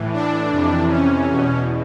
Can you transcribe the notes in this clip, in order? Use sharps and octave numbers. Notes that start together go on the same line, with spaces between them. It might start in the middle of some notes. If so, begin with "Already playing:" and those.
Already playing: A2 E3
D4
F2 C3 E3
C#4
E2 B2